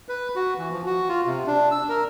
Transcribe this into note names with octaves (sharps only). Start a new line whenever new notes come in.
B4
F#4
E3
F3
F#4
F4
C3
D4
E6
A#4